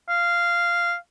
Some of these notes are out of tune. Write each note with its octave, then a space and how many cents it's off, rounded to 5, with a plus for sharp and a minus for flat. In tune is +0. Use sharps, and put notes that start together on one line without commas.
F5 -10